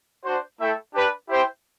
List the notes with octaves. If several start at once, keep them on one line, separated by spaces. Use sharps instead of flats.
D4 F#4 C5
A3 E4 A4 E5 G5
D4 G4 B4
E4 G4 C5 G5